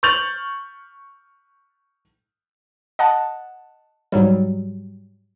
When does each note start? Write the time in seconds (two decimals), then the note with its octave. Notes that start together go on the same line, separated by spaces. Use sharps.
0.03 C#6 F6 G6 A6 F7 F#7
2.99 D#5 F#5 A5
4.12 G#2 F#3 G3